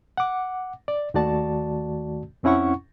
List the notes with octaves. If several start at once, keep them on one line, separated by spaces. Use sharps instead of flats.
F#5 D6
D5
D#2 D#3 A3 F#4 D5 A5
F2 C4 C#4 E4 F#5 C#6